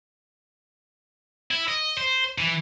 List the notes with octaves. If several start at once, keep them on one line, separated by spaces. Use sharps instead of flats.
E4
D#5
C5
E3